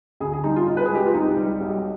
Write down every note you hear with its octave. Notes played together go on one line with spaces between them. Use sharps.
D2 G#4
G#4
G3 D#4
F4
B1
B4
G#4
G#3 G4
F4
C2 D#4
G3
B1